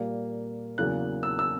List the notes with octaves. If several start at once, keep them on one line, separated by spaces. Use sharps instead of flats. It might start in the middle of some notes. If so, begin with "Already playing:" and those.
Already playing: A#2 G3 A#3
E2 C#3 F#3 A#3 F#6
E6
E6